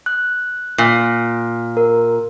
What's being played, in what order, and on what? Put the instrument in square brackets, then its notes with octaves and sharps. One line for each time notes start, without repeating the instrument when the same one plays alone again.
[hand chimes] F#6
[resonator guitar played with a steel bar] A#2
[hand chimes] A#4